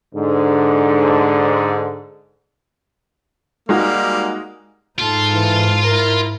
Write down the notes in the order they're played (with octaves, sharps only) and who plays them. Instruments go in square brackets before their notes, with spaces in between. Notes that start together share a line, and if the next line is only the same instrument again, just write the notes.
[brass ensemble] G#2 D3
[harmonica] G3 A#3 [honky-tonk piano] G#3 D#4 F#4
[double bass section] G#2 [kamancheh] D#4 A4 [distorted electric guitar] F4
[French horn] E3
[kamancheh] E4 A#5 [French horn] A#4